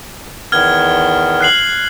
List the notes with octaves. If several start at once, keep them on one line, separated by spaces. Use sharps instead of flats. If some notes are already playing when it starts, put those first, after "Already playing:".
E2 D#3 B3 F6 G#6 G7
F#6 C7 F#7